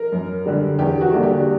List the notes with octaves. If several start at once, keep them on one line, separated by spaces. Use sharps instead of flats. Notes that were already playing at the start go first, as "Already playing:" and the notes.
Already playing: A#4
F#2
D3 G3
E2 G4
F#4
D3 G3 A#3 D4
G4